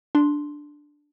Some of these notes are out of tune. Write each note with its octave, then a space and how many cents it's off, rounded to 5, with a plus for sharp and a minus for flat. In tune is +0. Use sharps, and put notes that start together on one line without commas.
D4 +0 C6 +0